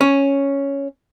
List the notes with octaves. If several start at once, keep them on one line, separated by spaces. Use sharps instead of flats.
C#4